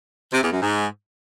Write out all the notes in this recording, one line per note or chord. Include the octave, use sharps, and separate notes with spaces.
C3
E2
F#2
G#2